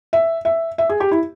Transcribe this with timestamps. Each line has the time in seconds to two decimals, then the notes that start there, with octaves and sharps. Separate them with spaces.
0.13 E5
0.45 E5
0.78 E5
0.89 G#4
1.00 G4
1.11 E4